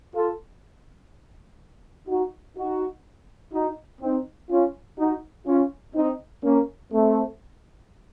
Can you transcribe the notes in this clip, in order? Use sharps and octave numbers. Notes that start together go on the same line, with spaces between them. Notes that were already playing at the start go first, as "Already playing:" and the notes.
F4 A4
D#4 F#4
D#4 F#4
D#4 F#4
C4 D#4
C#4 F4
D#4 F#4
C#4 F4
C4 D#4
A#3 C#4
A3 C4